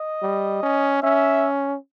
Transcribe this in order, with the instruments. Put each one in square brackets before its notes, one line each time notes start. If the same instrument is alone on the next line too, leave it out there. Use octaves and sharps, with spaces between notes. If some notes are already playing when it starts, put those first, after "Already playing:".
Already playing: [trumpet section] D#5
[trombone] G3
C#4
[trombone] C#4 [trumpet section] E5